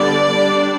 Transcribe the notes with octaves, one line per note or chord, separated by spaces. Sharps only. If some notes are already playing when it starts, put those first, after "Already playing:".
Already playing: D3 G3 B3 D4 D5
G3 D4